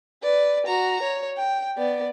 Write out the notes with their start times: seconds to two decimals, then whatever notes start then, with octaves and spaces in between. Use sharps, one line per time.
0.23 B4 D5
0.66 F#4 A#5
1.02 C#5
1.37 G5
1.77 B3 D5